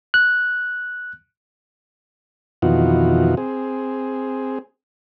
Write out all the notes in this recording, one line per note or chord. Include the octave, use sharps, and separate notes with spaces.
F#6
F2 B2 D#3 E3 F4 F#4
C4 G#4